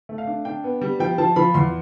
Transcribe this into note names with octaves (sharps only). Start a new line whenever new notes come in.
A3
F5
D4
D4 G5
B3
G3
F3 G5
F3 A5
F3 B5
E2 C6